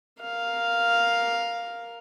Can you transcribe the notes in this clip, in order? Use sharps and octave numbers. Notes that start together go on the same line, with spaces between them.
A#4 F5